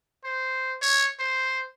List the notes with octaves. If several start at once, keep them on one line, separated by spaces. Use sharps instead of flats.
C5
C#5
C5